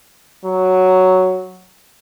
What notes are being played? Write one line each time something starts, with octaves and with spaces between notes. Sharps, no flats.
F#3